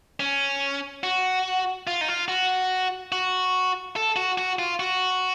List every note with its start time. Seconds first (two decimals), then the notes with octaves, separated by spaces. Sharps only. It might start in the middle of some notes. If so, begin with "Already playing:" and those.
0.20 C#4
1.03 F#4
1.87 F4
2.01 D#4
2.08 F4
2.28 F#4
3.12 F#4
3.96 A4
4.16 F#4
4.38 F#4
4.59 F4
4.80 F#4